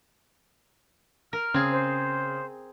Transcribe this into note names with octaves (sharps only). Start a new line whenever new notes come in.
A#4 F6
C#3 C4 G#4
C5